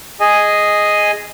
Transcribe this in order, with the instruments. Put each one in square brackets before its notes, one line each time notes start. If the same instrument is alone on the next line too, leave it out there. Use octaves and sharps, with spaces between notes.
[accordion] G#4 D#5 G#5